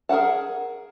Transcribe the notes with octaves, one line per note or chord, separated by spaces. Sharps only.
G#4 A#4 C#5 F#5 A5